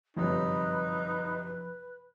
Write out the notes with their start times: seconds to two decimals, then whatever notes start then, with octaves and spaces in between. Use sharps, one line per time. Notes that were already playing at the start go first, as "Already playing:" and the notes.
0.17 G1 F#2 C3 F3 D#4 B4